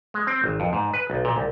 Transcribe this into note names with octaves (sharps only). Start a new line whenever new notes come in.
G#3
C4
G#1
F2
G#2
B4
B1
A#2
C2